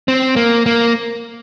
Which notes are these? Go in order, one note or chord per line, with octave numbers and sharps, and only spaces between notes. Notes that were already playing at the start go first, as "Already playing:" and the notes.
C4
A#3
A#3